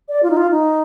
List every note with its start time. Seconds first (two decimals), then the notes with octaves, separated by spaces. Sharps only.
0.09 D5
0.23 F4
0.30 D#4
0.37 F4
0.51 D#4